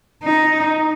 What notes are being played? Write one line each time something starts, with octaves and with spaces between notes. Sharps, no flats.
D#4